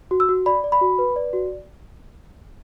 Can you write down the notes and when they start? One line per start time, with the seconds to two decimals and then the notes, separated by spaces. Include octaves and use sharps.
0.11 F#4
0.20 E6
0.29 F#4
0.46 D5 B5
0.64 D5
0.72 B5
0.81 F#4
0.98 B4
1.16 D5
1.33 F#4